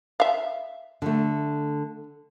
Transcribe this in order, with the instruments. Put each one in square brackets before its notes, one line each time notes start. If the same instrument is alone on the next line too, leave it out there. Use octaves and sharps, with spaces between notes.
[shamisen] E5 F5
[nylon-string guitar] D3 A3